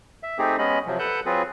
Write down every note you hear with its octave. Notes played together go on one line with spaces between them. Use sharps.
E5
A3 C4 D#4 G4 G#4
G#3 B3 C#4 D#5 B5
C3 F3 F#3
A4 B4 F#5 A5 F#6 G6
F#3 C4 F4 G#4 B4